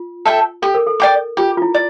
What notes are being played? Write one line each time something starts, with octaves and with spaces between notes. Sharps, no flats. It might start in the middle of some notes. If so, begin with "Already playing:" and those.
Already playing: F4
A4 E5 G5
G4 A4
A#4
A4
D5 G5 D6
F4 G4
F4
E4
D5